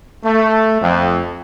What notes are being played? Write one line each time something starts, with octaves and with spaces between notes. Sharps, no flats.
A3
F2